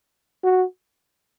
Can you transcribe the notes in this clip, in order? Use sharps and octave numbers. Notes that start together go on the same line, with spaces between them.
F#4